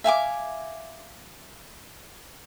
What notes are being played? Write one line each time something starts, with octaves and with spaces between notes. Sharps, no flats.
E5 F5 G#5 D6